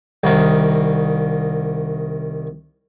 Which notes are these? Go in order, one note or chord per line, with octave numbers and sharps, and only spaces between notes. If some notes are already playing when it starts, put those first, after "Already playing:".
C2 D#3